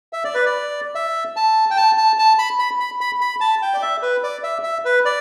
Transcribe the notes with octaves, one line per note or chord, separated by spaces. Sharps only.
E5
D5
B4
D5
E5
A5
G5
A5
A5
A5
B5
B5
B5
B5
B5
A5
G5
D5
E5
B4
D5
E5
E5
B4
D5